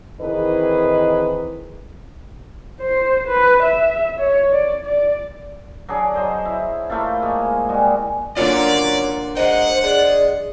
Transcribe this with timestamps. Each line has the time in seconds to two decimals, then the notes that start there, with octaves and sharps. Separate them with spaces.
0.20 D#3 E3 C4 G#4 B4 D#5
2.81 C5
3.27 B4
3.63 E5
4.19 C#5
4.52 D5
4.85 D5
5.89 F#3 D4 G#4 D5
6.14 F#3 C5 D#5
6.45 E4
6.90 A3 A#3 E4 F4
7.22 G#3 A#3 G#4
7.69 G3 G#3 F#4 G#4
8.36 D3 F#3 A#3 C#4 F4 A#4 D5
9.37 G#3 D#4 C5 F#5
9.84 G#3 D5